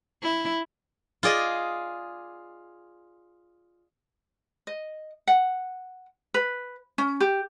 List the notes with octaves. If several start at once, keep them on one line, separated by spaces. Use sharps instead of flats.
E4
F4 G#4 D5 D#5
D#5
F#5
B4
C#4
G4